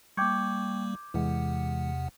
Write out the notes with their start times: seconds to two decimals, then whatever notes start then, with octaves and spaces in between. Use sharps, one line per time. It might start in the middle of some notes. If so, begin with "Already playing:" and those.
0.17 G3 A#3 G5 C#6 D6 G6 G#6
1.14 E2 C3 E3 G#3 F#5